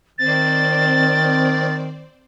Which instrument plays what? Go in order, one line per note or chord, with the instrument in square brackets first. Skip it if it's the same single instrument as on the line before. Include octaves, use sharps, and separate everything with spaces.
[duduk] D#3 [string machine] C4 C5 D5 [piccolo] A6